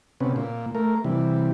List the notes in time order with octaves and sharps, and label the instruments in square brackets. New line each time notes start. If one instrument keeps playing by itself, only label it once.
[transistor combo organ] C3 B3 C#4
A#2
A3 A#4
C3 E3 G3